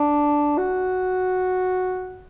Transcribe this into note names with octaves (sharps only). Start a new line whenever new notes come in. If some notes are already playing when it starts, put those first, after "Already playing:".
Already playing: D4
F#4